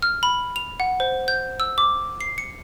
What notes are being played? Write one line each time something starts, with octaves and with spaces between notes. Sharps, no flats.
F6
B5
F7
F#5
C5
G6
E6
D6
C7
C#7